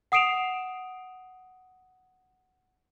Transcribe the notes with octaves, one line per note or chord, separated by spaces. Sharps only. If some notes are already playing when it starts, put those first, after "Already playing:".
F#5 D#6 C7 D7 E7 F7